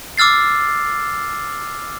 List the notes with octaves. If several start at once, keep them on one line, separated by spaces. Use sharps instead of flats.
D6 E6 F6 A6 C7